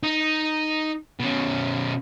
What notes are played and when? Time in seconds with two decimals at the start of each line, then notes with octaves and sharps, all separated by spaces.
0.03 D#4
1.19 B2 C#4